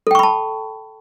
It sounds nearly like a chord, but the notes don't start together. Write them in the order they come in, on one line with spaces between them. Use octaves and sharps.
A4 G5 C#6 B5 A5